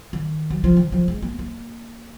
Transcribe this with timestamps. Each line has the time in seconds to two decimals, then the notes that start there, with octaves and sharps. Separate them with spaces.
0.13 D#3
0.50 F#3
0.64 F3
0.77 D#3
0.92 F3
1.08 G#3
1.22 A#3
1.39 A#3